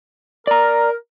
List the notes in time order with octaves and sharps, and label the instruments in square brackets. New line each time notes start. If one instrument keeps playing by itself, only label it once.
[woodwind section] A#4 [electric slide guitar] D5 A#5